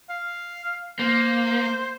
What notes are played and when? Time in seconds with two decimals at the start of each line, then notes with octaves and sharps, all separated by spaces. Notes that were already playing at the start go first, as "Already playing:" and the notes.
0.09 F5
0.99 A#3 C5